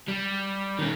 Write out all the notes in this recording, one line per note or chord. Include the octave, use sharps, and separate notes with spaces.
G3
D#3 C#4